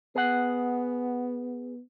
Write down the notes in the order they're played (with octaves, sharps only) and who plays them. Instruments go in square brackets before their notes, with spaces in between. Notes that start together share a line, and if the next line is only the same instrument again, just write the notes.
[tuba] B3 [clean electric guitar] G#4 F#5